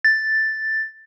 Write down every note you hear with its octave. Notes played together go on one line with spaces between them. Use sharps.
A6